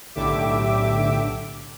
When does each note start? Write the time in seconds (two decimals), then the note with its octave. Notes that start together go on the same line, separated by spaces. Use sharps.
0.15 B1 A2 D3 G4 E5 D6